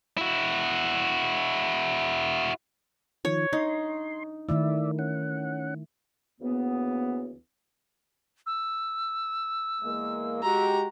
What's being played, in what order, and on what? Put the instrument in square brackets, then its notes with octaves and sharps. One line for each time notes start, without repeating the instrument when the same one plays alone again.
[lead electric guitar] E4 F#4
[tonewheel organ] D#3 F3 [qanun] C#5
[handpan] D4 [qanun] D#4 [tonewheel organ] C6
[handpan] D#3 A3 E4 [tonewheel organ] D5 E5
[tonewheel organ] C#4 F#5
[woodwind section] D2 C#3 E3 A#3 B3
[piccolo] E6
[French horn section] E2 G#3 A#3
[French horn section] G#3 G4 [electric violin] F#4 A#5